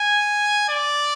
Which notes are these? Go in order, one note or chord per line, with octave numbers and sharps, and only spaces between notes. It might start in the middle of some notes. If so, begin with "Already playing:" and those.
Already playing: G#5
D5